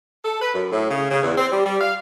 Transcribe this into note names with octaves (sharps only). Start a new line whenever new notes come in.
A4
B4
F#2
A2
C#3
C#3
E2
C4
G3
G3
F5